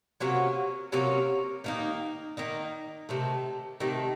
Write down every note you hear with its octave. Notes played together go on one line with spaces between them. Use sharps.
C3 F#3 A#3 C#4
C3 F#3 A#3 C#4
D#3 A#3 D#4
D#3 A#3 D#4
C3 D#3 A3
C3 D#3 A3